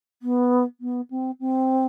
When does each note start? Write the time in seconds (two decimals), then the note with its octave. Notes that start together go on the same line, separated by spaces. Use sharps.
0.22 B3
0.81 B3
1.10 C4
1.40 C4